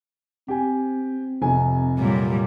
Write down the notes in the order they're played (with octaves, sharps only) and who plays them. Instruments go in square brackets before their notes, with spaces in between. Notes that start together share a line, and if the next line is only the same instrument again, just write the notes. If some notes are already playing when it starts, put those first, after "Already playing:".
[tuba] C4 [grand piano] G4 G#5
[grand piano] F1 C3 G#5
[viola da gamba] A#2 F#3 G3